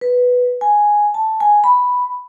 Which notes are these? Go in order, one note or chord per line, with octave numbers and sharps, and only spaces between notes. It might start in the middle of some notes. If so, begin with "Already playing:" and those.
B4
G#5
A5
G#5
B5